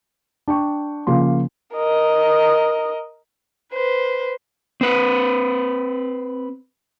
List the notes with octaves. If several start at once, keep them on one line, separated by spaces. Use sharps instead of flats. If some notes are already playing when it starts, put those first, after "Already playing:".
D4 G5 C#6
C#3 F3 A#3 C6
A#4 D#5
B4 C5
C4 B4